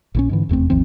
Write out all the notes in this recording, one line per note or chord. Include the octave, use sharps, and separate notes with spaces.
A#1 D3 C#4
G#2 D3 E3
F1 E2 A3 C4
G#1 D#2 F3 C4